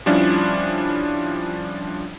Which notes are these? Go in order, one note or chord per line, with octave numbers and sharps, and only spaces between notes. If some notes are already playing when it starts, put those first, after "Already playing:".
F3 G3 C#4 D4 E4 F4